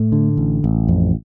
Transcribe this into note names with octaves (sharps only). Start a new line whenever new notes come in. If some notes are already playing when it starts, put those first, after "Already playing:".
Already playing: A2 A3
D3
A1
A1
F2